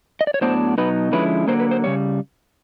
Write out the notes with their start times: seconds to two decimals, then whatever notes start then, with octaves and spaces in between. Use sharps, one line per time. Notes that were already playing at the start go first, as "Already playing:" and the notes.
0.21 D#5
0.27 D5
0.34 C#5
0.41 A2 F#3 B3 D4 C5
0.78 B2 F#3 B3 D#4 B4
1.12 D3 F3 G#3 C#4 E4 B4
1.48 D3 F#3 A#3 C5
1.60 B4
1.71 C5
1.84 C#3 E3 G3 C#5